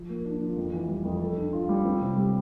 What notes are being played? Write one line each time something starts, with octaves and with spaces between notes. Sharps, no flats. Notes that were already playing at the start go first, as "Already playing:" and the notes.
Already playing: F3
A#3
D4
F3
F2
E3
G3
F2
A4
D4
F4
G3
C4
C3
G3